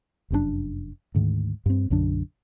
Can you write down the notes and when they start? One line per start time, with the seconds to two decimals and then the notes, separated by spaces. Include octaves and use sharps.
0.30 F1 F#2 A2 D4
1.15 D2 G#2 D#3
1.66 G2 C4
1.90 B1 F#2 D3 D4